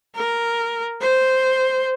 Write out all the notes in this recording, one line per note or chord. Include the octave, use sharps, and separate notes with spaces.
A#4
C5